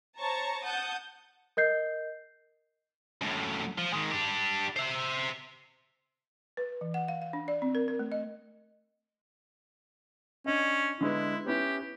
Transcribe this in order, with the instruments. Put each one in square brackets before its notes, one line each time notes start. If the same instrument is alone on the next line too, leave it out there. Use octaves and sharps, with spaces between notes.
[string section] C5 C#5 A5 A#5 C#6
F#5 A5 D#6 G6
[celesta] A#4 D#5 G6 C7
[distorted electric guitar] F#2 A2
F3
D#3 G#3
D4 G4
C5 E5
[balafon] B4
E3
F#5
F5
F5
D4
D5
C4
A#4
A#4
A3
D#5
[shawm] C#4 [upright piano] D4 D#5
[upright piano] D3 G#3 B3 [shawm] E4
[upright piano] B3 C#4 E4 [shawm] G4